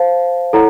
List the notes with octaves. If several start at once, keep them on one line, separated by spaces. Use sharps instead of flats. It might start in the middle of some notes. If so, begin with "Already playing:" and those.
Already playing: C5 F5 A5
E4 A4 C#5 F#5 A#5